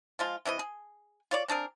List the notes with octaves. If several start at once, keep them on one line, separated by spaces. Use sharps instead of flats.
F3 G#3 F4
C3 E3 D#4 D#5
G#4
F4 C#5 D5
C4 D4 G#4 A#4